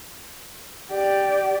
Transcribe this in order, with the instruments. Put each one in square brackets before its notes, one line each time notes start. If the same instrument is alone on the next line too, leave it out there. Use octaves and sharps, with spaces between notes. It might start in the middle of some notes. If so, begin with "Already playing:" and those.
[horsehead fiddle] G4 D5